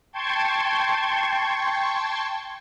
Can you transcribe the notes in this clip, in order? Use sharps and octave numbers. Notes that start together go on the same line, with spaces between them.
G5 A5 C6 C#6 G#6